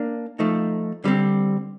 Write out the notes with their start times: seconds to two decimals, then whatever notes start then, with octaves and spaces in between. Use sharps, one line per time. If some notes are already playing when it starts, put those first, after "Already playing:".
Already playing: A#3 D4
0.39 F3 A3 D#4
1.04 D3 G3 C4